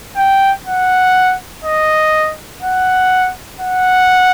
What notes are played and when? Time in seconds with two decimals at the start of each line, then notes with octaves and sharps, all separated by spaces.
0.17 G5
0.66 F#5
1.65 D#5
2.63 F#5
3.60 F#5